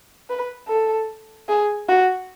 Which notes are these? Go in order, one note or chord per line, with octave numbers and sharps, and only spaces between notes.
B4
A4
G#4
F#4